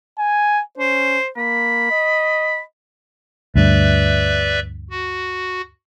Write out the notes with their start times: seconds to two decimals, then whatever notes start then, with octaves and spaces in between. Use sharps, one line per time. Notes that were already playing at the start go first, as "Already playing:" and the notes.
0.18 G#5
0.78 C#4 C5
1.37 A#3 B5
1.91 D#5
3.56 D2 G2 B4 D5 E5
4.91 F#4